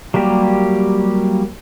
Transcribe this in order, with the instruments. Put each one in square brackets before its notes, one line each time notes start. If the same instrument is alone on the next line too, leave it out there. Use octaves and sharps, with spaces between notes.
[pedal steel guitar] F#3 G3 A#3 G4